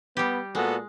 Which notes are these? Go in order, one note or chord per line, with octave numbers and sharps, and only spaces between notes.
G3 B3 G4
A#2 G#3 B3 F#4 A4